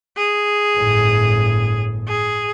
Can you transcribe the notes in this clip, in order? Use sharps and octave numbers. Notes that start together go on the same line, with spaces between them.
G#4
G1 A2
G#4